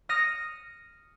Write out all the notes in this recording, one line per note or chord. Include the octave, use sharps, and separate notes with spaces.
D#6 F6 A#6 C#7 D#7